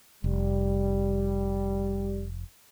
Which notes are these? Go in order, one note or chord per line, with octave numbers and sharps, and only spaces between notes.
F1 G3